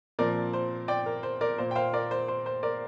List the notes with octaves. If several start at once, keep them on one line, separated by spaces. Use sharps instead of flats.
A#2 F3 C4 A#4 D5
C5
D5 G5
A#4
C5
A#4 D5
A#2 A#3 C5
G5
C5 F5
A#4 D5
C5
C5
C5
A#4 D5